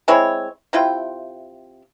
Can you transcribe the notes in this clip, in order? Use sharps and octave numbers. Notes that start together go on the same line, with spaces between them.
G#3 C4 E4 C#5
C3 E4 F4 G5